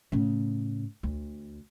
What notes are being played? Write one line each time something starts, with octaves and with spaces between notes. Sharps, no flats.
A2 C#3
D2